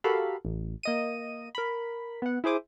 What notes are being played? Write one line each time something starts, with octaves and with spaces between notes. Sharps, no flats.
F#4 G4 A4 A#4 F5 B5
A1
A#3 D#5 D#7
A#4 B5
B3 F#5
E4 G#4 C5 D6 D#6